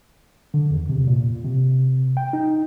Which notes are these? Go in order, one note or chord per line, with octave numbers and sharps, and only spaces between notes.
D3
E2
C3
A#2
C3
G5
D#4